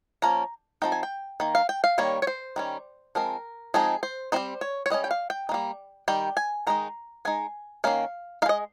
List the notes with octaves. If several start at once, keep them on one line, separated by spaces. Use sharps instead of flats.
F3 A#3 C#4 A#5
F3 C4 D#4 G5
G#5
G5
D#3 A#3
F5
G5
F5
D#3 G3 A#3 C#5
C#5
C5
D#3 G3 C#4
F3 G#3 C4 A#4
F3 G#3 C4 D#4 G#4
C5
G3 C4 D#4 C5
C#5
C#5
G3 A#3 C#4 D#5
G5
F5
G5
D#4
G3 A#3
D#3 G3 G5
G#5
D#3 G#3 D#4 A#5
G#3 D#4 G#5
D#3 A#3 C#4 F5
D#4 F5
G#3 D#5